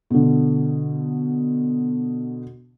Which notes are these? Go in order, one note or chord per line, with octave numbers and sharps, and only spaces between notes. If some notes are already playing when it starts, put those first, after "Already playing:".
B2 D3